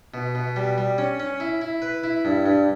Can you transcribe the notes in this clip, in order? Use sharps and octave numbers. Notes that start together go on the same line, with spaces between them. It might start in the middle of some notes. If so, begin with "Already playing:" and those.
B2
B2
G3
G3
C#4
C#4
E4
E4
B4
E4
G2
G2